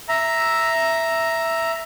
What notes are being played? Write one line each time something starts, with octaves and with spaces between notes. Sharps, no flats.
E5 A#5